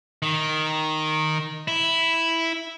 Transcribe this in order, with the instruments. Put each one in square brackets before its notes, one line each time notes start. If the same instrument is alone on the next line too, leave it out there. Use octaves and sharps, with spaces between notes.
[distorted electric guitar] D#3
E4